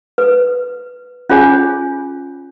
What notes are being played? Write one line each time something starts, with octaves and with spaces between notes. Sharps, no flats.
B4
C#4 F4 G#4 C#5 G#5